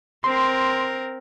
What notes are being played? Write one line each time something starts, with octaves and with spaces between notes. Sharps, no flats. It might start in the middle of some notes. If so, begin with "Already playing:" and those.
C4 A#4 C6